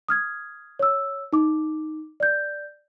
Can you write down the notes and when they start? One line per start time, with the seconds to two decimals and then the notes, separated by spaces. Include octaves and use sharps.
0.09 D#6 F6 G#6
0.79 C#5 E6
1.33 D#4 D6
2.20 D5 G6